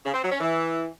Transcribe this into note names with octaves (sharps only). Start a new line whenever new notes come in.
C#3
C4
F#3
C#4
E3